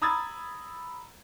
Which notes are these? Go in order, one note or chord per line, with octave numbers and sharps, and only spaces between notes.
A#5 B5 D#6 E6 G#6 A6